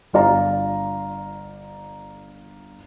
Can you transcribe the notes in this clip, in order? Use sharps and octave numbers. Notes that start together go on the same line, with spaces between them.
G1 F4 D5 A#5